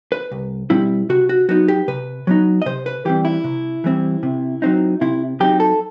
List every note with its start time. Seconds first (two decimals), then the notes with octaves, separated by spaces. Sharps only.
0.12 B4
0.31 C2
0.70 B2 G3 C4 E4
1.09 C3 F#4
1.29 F#4
1.49 F#3 B3 D#4 F#4
1.68 G4
1.88 C3 B4
2.27 F#3 B3 D#4
2.62 D#5
2.66 C3 C5
2.86 B4
3.05 E3 G3 C4 G4
3.25 E4
3.44 C3
3.84 E3 G3 C4
4.23 C3
4.62 F#3 C4 D#4
5.01 C3 E4
5.40 F#3 C4 D#4 G4
5.60 A4